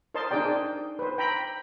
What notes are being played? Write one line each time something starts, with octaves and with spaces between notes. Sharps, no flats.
A#4 C5 D#5 A5 C6
D4 D#4 G#4 A#4 D5 G5
B4 C5
G5 A#5 B5